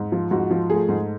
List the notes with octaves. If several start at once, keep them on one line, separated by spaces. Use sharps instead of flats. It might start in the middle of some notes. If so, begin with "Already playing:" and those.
Already playing: G#2
F3
G#2 F#4
F3
A3 G#4
G#2